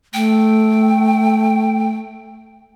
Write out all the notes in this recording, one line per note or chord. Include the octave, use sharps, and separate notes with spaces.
A3 G5